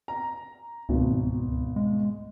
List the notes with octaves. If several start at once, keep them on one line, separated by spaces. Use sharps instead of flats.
A#5
G#1 C#2 B2
G#3